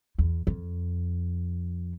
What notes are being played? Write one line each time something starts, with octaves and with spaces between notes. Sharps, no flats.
E2
F2